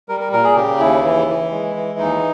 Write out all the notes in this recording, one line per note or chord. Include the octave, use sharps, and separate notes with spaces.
G3 A#4
A#4
A#2 A#4
G#4
C#3 G4
D#2 E4
E3
E3
G#3
E3
D#2 D#4